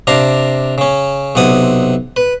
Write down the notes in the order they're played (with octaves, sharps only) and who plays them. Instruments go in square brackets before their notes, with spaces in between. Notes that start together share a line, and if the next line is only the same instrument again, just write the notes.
[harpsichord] C3 D4 F5 A#5
C#3 C#4
B1 C3 F#5 D#6
B4